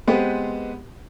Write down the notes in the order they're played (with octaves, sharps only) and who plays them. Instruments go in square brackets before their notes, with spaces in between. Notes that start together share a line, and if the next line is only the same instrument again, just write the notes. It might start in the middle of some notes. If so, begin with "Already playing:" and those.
[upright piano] G#3 B3 C4 G4 B4 C5